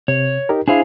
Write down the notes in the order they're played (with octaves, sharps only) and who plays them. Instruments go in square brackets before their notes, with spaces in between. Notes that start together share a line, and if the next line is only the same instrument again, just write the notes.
[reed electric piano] C3 [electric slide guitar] C#5
[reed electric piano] D#4 G4 A#4
[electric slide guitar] D4 G#4 F5 [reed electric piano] E4 C5 G#5